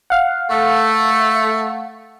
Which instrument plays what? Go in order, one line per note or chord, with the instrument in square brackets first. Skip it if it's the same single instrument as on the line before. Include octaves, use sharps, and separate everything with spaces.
[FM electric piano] F5 F#5
[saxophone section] A3